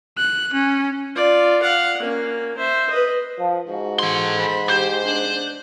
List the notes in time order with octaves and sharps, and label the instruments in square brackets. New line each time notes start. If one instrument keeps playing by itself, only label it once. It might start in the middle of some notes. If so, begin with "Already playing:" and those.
[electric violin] F#6
C#4
[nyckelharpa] F4 D5
F5 F#5
A#3 C#4
C5 E5
B4 D#5
[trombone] F3
[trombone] G#2 [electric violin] F#4
[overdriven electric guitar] A4 C6
[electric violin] C5 B5
[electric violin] G4 [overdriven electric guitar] C5
[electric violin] D4 F#6